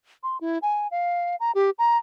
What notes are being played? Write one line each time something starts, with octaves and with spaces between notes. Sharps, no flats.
C6
E4
G#5
F5
A#5
G4
A#5